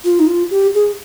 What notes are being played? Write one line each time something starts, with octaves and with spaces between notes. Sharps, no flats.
F4
D#4
F4
G4
G#4